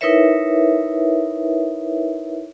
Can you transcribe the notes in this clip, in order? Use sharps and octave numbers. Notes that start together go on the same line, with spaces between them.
D#4 E4 A#4 B4 C#5 E5